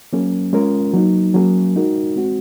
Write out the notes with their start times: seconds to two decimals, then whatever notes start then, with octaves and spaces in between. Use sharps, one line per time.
0.13 F#3 A#3 C#4 G#4
0.53 G#3 C#4 F4 A#4
0.94 F#3 A#3 D#4
1.34 F#3 A#3 C#4 G#4
1.76 G#3 D#4 F#4 A#4
2.16 G#3 C4 F#4